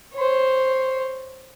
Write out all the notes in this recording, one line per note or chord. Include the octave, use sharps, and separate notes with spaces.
C5 C#5